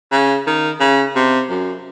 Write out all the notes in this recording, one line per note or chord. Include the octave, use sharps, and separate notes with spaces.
C#3
D#3
C#3
C3
F#2